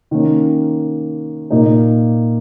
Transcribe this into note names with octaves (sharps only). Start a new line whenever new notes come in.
D#3 A#3 C#4
A#2 A#3 D#4